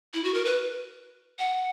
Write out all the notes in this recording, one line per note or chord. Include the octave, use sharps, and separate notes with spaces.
E4
F#4
A#4
B4
F#5